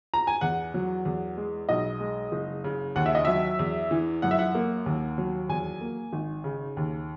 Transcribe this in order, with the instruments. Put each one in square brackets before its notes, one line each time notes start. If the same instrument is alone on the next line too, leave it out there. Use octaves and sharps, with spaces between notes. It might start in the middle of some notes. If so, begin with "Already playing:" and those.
[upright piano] A#5
G#5
E2 F#5
F#3
E2
G#3
B1 D#5
G#3
F#1
C#3
D#2 F#5
E5
D#5
F#3 E5
E2
E3
F#2 F#5
E5
F#5
A#3
D#2
F#3
E2 G#5
A#3
G#1
C#3
D#2